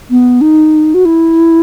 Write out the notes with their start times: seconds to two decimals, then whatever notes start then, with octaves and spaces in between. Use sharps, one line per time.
0.10 B3
0.41 D#4
0.94 F#4
1.05 E4